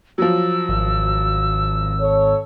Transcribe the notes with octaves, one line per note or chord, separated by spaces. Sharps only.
F3 F#3 E6
G#1
A4 C#5